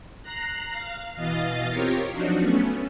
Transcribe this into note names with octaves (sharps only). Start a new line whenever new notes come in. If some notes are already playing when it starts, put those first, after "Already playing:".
A#5 F#6 A#6 C7
F5
B2 E3 D#5 F5 A6
C4 F4 G4 A#4 C#5
F3 F#3 D4 D#4 F#4
A3 B3 C#4